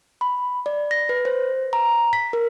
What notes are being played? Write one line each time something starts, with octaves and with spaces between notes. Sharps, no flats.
B5
D5
A#6
B4
C5
A#5
B6
A#4